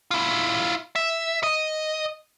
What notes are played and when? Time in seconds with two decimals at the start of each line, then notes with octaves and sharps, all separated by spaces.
0.11 E4 F4
0.96 E5
1.43 D#5